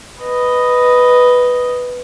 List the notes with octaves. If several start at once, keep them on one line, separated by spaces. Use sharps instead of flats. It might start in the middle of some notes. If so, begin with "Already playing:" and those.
B4 D#5